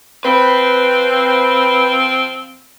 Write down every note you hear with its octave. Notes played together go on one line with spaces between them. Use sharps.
F3 C4 B4